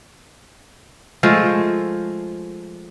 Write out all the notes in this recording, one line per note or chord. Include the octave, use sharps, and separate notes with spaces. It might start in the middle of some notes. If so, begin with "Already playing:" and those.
F3 G#3 A3